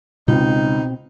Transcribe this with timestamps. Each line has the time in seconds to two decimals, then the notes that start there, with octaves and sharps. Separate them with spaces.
0.28 C#2 B2 C4 D#4